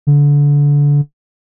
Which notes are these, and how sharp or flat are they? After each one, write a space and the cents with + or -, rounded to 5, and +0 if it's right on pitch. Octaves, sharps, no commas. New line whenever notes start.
D3 -25